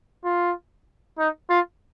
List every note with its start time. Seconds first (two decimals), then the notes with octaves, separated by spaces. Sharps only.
0.25 F4
1.19 D#4
1.50 F4